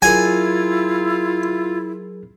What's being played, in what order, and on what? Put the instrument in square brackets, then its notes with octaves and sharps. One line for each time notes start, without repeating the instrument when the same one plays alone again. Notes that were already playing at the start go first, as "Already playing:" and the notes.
[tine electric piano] F#3 G#4 A#4 [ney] E4 [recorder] F4 [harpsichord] G#5